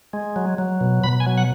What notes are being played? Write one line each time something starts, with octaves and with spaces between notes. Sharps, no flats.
G#3
F#3
F#3
B2
B2 B5
G#5
F#3
F#5